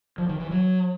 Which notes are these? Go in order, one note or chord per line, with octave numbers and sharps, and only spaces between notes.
F3
D#3
E3
F#3